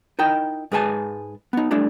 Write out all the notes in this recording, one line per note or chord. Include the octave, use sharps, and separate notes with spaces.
D#4 E4 A#4 D#5 G5
G#2 G#3 G#4 B4 G#5 A5
B3 D#4
G3 A3 D4 E4